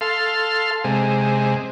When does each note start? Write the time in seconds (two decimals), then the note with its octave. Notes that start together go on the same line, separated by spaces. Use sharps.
0.01 A4 F5 C6
0.84 C3 G#3